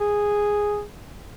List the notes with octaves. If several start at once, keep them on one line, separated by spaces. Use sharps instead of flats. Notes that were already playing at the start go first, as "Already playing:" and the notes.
G#4